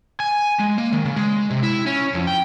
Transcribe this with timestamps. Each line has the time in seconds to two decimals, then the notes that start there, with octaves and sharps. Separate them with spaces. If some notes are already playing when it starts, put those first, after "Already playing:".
0.20 G#5
0.59 G#3
0.78 A#3
0.93 D#3
1.05 C#3
1.16 G#3
1.50 C3
1.63 E4
1.87 C#4
2.14 F2
2.27 G5